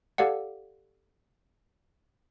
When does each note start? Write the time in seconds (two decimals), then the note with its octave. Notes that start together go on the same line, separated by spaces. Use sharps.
0.18 G4 A4 D5 F5 F#5